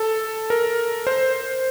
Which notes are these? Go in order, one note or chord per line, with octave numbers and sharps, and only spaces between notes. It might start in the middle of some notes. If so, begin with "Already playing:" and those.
Already playing: A4
A#4
C5